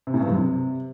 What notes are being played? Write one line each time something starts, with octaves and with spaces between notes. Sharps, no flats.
C3
A2
G2
F#2
C3